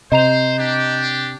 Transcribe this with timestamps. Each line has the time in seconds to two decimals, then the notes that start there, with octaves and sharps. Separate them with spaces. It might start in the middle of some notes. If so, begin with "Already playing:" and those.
0.12 C3 C5 D#5 A#5 F7
0.59 D4 G4